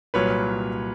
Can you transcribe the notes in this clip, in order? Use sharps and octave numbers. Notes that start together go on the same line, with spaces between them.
C2 A#2 F#3 B4 C#5